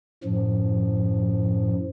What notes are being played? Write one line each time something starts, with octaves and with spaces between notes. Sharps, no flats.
F#2 A2 F3